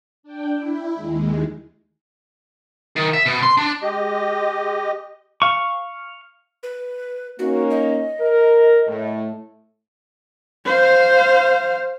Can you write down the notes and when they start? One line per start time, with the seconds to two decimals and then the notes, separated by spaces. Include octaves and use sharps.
0.23 D4 G5
0.55 E4
0.95 D#2 G#3
2.96 D#3
3.14 E5
3.26 B2
3.42 C6
3.57 D4
3.82 G#3 G4 D#5
5.42 F5 C#6
6.63 B4
7.39 A#3 C#4 D#4 F#4
7.70 D#5
8.20 A#4
8.87 A2 A3
10.66 C5 F5